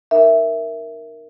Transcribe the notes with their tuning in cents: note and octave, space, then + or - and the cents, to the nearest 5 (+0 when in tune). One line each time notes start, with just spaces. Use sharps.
D#4 -25 A#4 +0 E5 +0